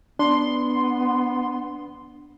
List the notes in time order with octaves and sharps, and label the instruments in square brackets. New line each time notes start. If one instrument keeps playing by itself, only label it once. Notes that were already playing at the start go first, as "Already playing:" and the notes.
[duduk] B3 [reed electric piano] D4 [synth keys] C6